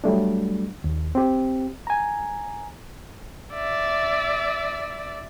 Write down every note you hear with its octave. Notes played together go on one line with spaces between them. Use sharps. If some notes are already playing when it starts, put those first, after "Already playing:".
F#3 G3 A3 D4
D#2
C4 G4
G#5 A#5
D5 E5